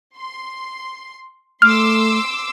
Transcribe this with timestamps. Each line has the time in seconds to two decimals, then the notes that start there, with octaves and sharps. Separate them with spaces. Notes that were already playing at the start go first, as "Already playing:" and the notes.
0.15 C6
1.62 A3 C6 D6 E6 F6